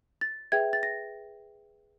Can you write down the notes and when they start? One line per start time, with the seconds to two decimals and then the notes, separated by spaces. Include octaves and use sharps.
0.21 A6
0.52 G#4 B4 E5 G5 G#6
0.73 A6
0.83 A#6